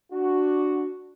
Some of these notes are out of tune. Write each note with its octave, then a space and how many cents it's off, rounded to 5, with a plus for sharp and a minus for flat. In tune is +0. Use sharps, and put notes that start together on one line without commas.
D4 +0 F#4 +0